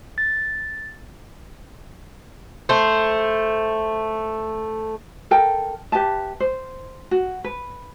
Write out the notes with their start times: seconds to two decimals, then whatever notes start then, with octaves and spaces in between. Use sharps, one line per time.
0.18 A6
2.69 A3 C5
5.31 A4 A#4 G5
5.92 G4 B4 E5 A5
6.40 C5
7.11 F#4
7.44 B4